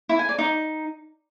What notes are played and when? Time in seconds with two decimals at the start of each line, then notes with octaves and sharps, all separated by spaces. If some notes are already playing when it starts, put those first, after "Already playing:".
0.09 E4
0.19 G#5
0.29 D5
0.38 D#4